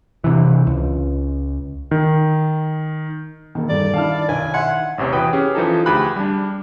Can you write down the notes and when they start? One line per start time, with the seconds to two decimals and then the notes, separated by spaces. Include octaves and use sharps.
0.24 C3 E3
0.67 C#2
1.91 D#3
3.55 E1 D#3 A#3
3.69 G2 A4 D5
3.94 D#3 D4 E4 F5 A5 F6
4.28 B1 G#5
4.54 E5 F#5 C6 G#6
4.98 A1 E2 C3 C#5
5.13 E3 F#4 B4 G5 D#6
5.33 C#4 G4 G#4
5.55 E3 F3 D#4 A4
5.86 D2 G4 G#4 B5 F#6
6.16 G3 D4